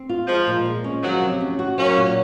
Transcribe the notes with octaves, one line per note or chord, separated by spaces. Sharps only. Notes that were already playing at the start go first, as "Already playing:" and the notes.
Already playing: C4
F4
F3 G#3
A#2
G#3
C#4
D#3 F3 F#3
C3
C#4
F#4
F#3 A#3 C#4
A#2